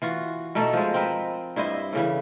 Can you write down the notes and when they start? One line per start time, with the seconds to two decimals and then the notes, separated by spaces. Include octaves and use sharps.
0.02 E3 F4 F#4
0.55 B2 A3 D#4 A4
0.73 F3 G#3
0.94 C4 A#4 B4
1.56 G2 E4 C5 D#5
1.93 A2 C#3 E3